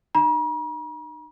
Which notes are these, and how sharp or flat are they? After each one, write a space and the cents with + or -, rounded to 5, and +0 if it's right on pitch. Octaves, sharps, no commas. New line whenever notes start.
D#4 -40 A#5 +45